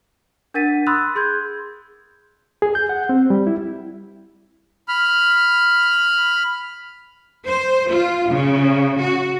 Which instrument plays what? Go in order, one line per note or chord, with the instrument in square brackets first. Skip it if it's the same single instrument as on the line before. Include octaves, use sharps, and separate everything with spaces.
[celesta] D4 A#4 F#5 A6 B6 D#7
B5 C6 D#6 E6 F#6 A6
G#4 C6 G6 G#6
[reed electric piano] G#4
G6
F#5
C4
G3
E4
[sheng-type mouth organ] B5 F6
[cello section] C5
F4
C#3
F#4